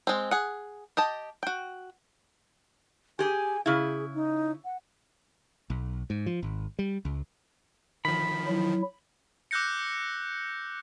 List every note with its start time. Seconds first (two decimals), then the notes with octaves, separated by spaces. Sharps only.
0.07 G#3 C4
0.31 G#4 F#5
0.97 G4 D#5 A5
1.43 F#4 G5
3.19 G4 G#4 G#5
3.66 C#3 E4 G#4
4.15 D#4
4.65 F#5
5.70 B1
6.10 G#2
6.26 F3
6.43 G#1
6.79 G3
7.05 C#2
8.05 D#3 F3 B5
8.47 F#3 E4
9.51 D6 E6 F#6 G6 A#6 C#7